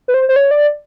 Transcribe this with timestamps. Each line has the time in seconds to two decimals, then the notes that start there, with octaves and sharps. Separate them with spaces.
0.08 B4
0.14 C5
0.29 C5
0.36 C#5
0.51 D5